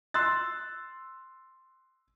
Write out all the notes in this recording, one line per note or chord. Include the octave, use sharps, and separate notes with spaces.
C6 E6 F#6 A6